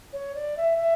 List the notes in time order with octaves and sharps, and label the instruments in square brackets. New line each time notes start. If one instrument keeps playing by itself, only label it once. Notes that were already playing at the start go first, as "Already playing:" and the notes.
[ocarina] C#5
D5
E5
E5